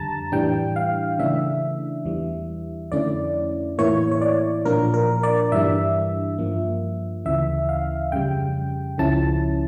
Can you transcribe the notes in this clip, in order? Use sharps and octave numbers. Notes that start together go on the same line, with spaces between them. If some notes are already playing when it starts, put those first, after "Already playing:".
Already playing: F2 D3 G3 A5 A#5
A2 E3 G3 D4 G5
F5
C#3 E3 A3 D4 E5
E2 E3 G3
F2 D3 A3 C#4 E4 D5
A2 E3 A#3 E4 C#5
C#5
D5
A#2 F3 A#3 D4 A#4
A#4
D5
G2 E3 G3 D4 E5
G2 F3 A#3
D2 C#3 E3 E5
F5
F2 C#3 G3 G5
C#2 C#3 F3 C#4 E4 A5